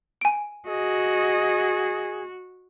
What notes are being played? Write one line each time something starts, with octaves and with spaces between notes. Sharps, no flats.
G#5 D7
F#4 G#4 D#5